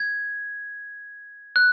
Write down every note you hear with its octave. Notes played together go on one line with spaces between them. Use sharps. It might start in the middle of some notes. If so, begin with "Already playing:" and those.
Already playing: G#6
F#6